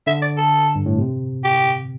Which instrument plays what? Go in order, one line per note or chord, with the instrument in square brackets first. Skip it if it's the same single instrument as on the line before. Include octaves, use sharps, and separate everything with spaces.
[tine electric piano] D3 [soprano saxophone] E5
[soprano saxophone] D5
A4
[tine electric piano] G2
A2
C3
[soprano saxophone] G4